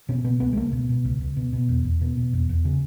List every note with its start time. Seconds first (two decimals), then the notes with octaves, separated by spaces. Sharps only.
0.09 B2 C#4
0.24 B2 B3
0.40 C#2 B3
0.53 G#3
0.56 C#2 A#3
0.72 B2
0.89 B2
1.05 C#2
1.21 C#2
1.37 B2
1.53 B2
1.69 E2
1.85 E2
2.01 B2
2.17 B2
2.33 E2
2.49 E2
2.65 C#3